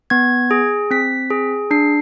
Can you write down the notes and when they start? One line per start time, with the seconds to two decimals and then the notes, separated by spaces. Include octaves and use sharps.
0.10 B3 G#6
0.51 G#4
0.91 C4 B6
1.30 G#4
1.71 D4 C7